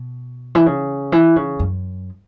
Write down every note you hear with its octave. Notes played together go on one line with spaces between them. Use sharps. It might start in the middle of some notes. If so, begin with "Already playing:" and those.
Already playing: B2
E3
C#3
E3
C#3
F#2